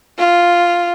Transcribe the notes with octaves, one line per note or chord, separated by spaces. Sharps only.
F4